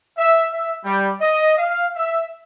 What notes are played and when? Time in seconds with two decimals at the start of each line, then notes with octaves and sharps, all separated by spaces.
0.18 E5
0.51 E5
0.85 G3
1.21 D#5
1.57 F5
1.96 E5